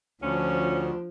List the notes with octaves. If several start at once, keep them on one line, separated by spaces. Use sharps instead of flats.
D2 F3 C#4 D4 F4 C5